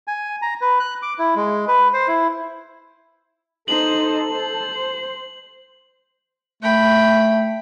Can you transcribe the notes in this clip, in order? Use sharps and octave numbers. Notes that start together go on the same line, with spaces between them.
G#5
A#5
B4
F#6
D6
E4
G#3
B4
C5
E4
D#4 A4 C5 F#7
C5
A3 G5 B5